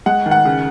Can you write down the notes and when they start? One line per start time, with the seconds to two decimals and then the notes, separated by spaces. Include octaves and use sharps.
0.06 G#3 F#5
0.26 D#3
0.31 F#5
0.45 C#3